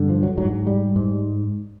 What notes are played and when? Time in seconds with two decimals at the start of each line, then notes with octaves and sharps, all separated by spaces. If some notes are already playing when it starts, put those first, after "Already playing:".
Already playing: G2 D3
0.09 F3
0.23 F#3
0.38 G#2 F#3
0.67 G3
0.96 G#2